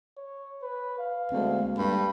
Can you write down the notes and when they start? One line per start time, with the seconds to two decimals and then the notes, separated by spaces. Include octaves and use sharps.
0.17 C#5
0.62 B4
0.99 F5
1.32 D2 G#3 A#3 C4
1.78 G2 B5